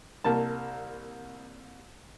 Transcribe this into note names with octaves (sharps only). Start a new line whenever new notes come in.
C2 A#3 A5